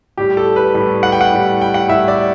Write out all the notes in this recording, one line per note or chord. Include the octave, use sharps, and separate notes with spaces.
A2 G3 G4
A4
B4
A2 G3
F#5
G5
F#5
A2 G3
G5
F#5
A2 G3 E5
D5